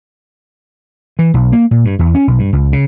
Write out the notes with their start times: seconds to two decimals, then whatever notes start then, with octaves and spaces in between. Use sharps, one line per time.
1.19 E3
1.34 B1
1.52 A#3
1.71 A#2
1.85 G2
1.99 E2
2.15 C#4
2.27 B1
2.39 G2
2.53 C#2
2.73 C#3